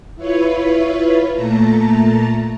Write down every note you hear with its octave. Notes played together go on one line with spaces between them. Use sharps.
E4 F4 B4 C#5
A#2 A3 A5 A#5